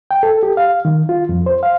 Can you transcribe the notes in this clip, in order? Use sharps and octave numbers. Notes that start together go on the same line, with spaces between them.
G5
A4
G4
F5
D#3
F4
F2
C5
F5